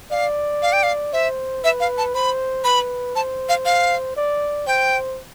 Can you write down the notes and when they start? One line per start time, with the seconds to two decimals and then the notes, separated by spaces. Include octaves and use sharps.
0.11 D5 F5
0.62 F5
0.73 G5
0.83 F5
1.13 C5 E5
1.63 B4 E5
1.80 F5
1.98 A5
2.14 C5 B5
2.64 B4 B5
3.15 C5 A5
3.49 F5
3.65 F5
4.17 D5
4.67 C5 G5